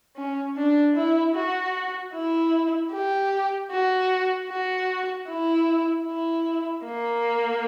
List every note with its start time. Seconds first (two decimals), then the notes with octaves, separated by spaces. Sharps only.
0.16 C#4
0.56 D4
0.96 E4
1.35 F#4
2.14 E4
2.92 G4
3.71 F#4
4.50 F#4
5.29 E4
6.08 E4
6.86 A#3